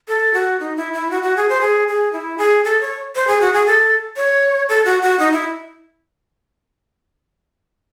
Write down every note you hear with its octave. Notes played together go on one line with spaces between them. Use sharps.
A4
F#4
D#4
E4
E4
F#4
F#4
G#4
C5
G#4
G#4
E4
G#4
A4
C#5
C5
G#4
F#4
G#4
A4
C#5
A4
F#4
F#4
D#4
E4